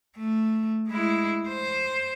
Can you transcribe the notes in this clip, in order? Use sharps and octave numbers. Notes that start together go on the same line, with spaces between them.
A3
G#3 E4
C5